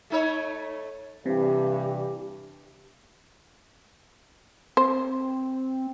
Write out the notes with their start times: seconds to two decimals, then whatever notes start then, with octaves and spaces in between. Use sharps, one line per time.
0.10 A3 D#4 C#5
1.26 G2 C3 E3 G4
4.77 C4 C5